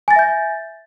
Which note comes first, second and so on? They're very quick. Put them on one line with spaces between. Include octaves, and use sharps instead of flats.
G#5 A6 A#6 E5 G6